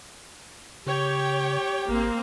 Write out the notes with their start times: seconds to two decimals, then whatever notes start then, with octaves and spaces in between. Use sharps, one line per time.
0.86 C#3 G4 C#5 G5
1.88 G#1 A#3 C4